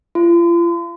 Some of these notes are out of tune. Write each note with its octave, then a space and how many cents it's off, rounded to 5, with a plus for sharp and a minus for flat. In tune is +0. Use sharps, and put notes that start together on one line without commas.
F4 -40